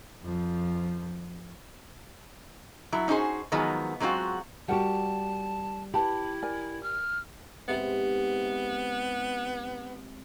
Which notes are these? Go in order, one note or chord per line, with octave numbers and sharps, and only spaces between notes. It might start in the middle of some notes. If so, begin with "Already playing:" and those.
F2 F3
F#3 E4 A4
C#4 D#4 F#4 G#4 C5
D#3 F3 F#3 G#3 B3
F#3 G#3 C4 F4 F#4
G3 F#4 G4 A#4 F#5 A5
E4 G4 B4 A5 B5
A#4 D5 G#5
F6
G#2 C3 B3 B5